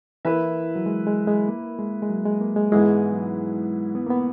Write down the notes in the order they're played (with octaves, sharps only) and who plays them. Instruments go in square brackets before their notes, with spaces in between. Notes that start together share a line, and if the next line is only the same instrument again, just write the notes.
[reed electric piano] E3 [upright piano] A#3 E4 B4 E5
[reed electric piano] F#3
G#3
G#3
G#3
A#3
G#3
G#3
F#3
G#3
A#3
G#3
[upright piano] G#2 E3 B3 E4 G#4 [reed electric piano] G#3
[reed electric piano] F#3
B3
A#3
B3